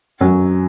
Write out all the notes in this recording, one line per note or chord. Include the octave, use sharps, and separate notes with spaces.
F#2 F#3